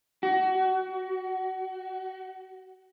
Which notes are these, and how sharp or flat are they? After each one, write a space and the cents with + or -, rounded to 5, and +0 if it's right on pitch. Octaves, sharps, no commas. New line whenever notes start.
F#4 +25